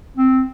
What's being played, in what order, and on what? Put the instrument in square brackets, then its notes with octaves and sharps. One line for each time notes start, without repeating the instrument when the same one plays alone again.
[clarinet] C4